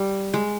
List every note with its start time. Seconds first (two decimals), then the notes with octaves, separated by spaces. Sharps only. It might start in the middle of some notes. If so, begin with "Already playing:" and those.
Already playing: G3
0.34 G#3